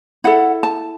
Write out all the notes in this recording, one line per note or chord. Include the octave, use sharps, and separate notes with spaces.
E4 A4 F#5
A5